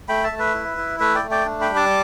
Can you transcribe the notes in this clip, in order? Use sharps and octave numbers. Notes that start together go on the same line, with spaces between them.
A3 G5 B5
E5 A5
A3
B4 E5
E4
E4
A3 B4 E5
D5 G5
A3
D5 G5
D4
G5 B5
G3
A5 D6